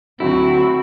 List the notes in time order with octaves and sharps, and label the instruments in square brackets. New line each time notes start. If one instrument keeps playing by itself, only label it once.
[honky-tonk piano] D2 F#3 [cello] C4 F#4 [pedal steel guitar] E4